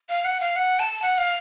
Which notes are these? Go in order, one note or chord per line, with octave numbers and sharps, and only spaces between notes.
F5
F#5
F5
F#5
A5
F#5
F5